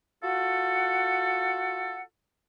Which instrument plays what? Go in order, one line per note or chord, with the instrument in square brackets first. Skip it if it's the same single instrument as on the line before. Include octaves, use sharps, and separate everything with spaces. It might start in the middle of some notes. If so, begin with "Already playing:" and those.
[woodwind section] F4 F#4 A4 F#5